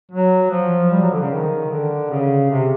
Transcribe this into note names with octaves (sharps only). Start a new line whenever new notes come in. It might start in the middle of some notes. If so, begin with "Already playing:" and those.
F#3
F3
G3
F#3
D3
C#3
D#3
D3
C#3
C3